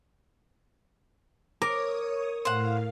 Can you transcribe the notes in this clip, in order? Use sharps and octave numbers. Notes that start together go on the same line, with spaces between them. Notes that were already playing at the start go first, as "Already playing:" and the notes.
A#4 C#5 D6 D#6
A2 C5 F5 F#5